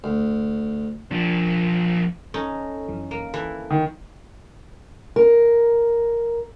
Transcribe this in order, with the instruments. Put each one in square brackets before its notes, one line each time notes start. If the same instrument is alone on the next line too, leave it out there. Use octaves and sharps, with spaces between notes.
[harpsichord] D2
[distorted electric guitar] F3 D4
[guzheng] C#4 D#4 [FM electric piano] A4
[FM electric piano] F#2 E3
[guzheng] A#3
[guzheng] E3 [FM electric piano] A4
[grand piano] D#3
[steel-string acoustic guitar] A#4